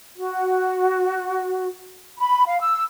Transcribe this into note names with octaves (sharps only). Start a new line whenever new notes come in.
F#4
B5
F5
E6